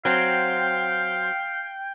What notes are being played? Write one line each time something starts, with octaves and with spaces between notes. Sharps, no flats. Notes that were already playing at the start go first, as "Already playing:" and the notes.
F#3 C4 F5 G5